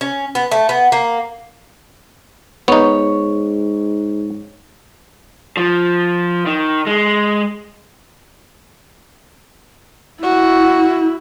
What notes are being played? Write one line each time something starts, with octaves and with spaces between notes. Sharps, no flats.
C#4
B3
A3
B3
A#3
G#2 B3 D#4 C#5
F3
D#3
G#3
E4 F#4